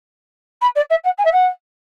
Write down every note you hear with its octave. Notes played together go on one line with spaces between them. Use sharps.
B5
D5
E5
F#5
G#5
E5
F#5